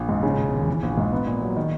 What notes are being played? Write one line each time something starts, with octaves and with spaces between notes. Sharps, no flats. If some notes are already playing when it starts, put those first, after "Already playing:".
Already playing: A#1
G#2
C#3
E1
D#2
E3
A#1
G#2
B3
A#2
F#3
D#3